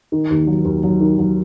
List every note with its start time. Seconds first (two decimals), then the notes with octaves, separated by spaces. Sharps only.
0.12 D#3
0.30 D#2
0.47 F#3
0.65 D#2
0.83 F#3
1.01 D#3
1.18 F#3